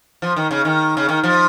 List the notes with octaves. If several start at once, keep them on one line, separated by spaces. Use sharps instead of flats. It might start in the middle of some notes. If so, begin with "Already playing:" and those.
F3
D#3
C#3
D#3
C#3
D#3
F3